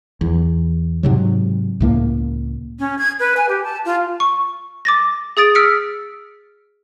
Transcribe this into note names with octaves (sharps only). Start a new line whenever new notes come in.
E2
G#2 C3 F#3
C#2 A2 A#3
C#4
G#6
B4
G#5
G4
A5
F4
C#6
D6 A6 A#6
G#4 D#6 A6 D7
E6 F6 B6 C#7 D7